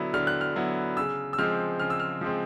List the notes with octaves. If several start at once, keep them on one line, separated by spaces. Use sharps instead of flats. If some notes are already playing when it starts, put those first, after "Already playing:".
Already playing: D3 F#3 B3 E4
D3 F6
F#6
F6
F#3 B3 E4
C#3 E6
E6
F3 G#3 C4 F6
C#3 F6
E6
F6
F3 G#3 C4